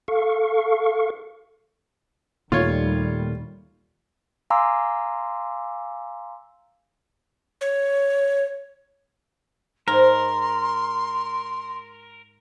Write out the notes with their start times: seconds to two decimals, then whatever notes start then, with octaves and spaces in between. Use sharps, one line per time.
0.08 A4 F5 C#6
2.52 D#2 A#2 D#3 G3 A3 F4 C#5
4.50 F5 G#5 A#5 C6 D6 E6
7.61 C#5
9.88 G#2 A#4 C6